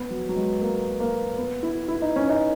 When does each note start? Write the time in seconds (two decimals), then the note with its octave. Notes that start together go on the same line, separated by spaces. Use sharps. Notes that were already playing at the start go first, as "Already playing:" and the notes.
Already playing: B3
0.11 F#3
0.29 F#3
0.36 G#3
0.61 A#3
1.00 A#3
1.38 B3
1.63 E4
1.88 E4
2.02 D#4
2.16 C#4
2.29 D#4